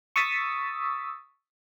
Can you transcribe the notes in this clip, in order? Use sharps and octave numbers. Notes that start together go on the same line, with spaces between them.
C#6 D#6 E6 A6 B6